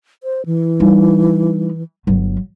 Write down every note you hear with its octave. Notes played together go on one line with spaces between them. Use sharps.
C5
E3
G3 D#4
G1 F#3